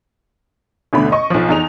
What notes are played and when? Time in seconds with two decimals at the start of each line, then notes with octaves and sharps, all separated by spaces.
0.93 A1 D2 B2 D3 A3 B5
1.12 D#5 C#6
1.30 B1 F3
1.49 E2 D#4 F7